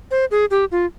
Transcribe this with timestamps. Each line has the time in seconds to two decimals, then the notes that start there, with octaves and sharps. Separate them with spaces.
0.11 C5
0.31 G#4
0.51 G4
0.72 F4